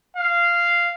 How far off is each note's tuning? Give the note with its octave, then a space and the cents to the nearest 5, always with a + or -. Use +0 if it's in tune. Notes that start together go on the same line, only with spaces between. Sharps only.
F5 -10